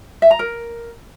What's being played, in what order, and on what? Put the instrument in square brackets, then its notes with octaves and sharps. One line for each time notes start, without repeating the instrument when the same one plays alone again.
[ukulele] E5
A#5
A#4